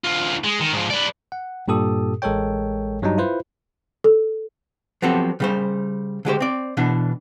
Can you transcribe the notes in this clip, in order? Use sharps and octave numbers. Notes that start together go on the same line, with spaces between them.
D2 F4
G#3
D#3
G#2 F3
B4 D5
F#5
G2 A#2 G4 A4 D#6
A1 G#3 A4 A#4 C#5 G5
G2 F#3 G3 D4 D#4
E4 F4 B4 C5
A4
F3 F#3 B3 C4 G4 A4
C#3 G3 C5
D3 G#3 G4 C5
C4 D5
B2 E3 D4